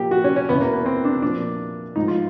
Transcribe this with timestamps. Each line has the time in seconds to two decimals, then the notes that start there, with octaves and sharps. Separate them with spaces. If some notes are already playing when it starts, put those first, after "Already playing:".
Already playing: A#2 F3 G4
0.11 F#4
0.24 C#4
0.36 C#4
0.49 E2 B2 B3
0.61 A#3
0.73 B3
0.86 C4
1.05 D4
1.22 A#2 F3 D4
1.96 G#2 F3 D#4
2.08 F4